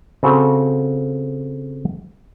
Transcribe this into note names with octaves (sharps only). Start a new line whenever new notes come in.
C#3 C4 F#4 A4